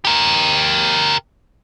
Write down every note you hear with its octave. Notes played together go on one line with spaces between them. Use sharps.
G4 A#4